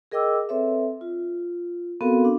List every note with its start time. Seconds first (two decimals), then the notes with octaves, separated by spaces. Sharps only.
0.11 G#4 A#4 D#5 G5 D6 E6
0.49 C4 A4 B4 C#5 E5
1.01 F4
2.01 B3 C4 F#4 A4 A#4 F5
2.25 D4